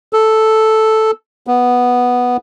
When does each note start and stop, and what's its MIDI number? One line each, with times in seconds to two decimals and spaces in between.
0.13 1.11 69
1.47 2.37 59